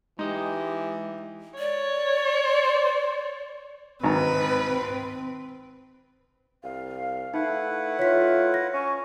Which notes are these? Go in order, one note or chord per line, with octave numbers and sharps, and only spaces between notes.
E3 G#3 D#4 G4 D#5
C#5 D5
G#1 C4 B4 A#5
C2 F5
A3 D#4 E4 B4 F#5
A3 F4 C#5 B6
A#6
C#4 C#6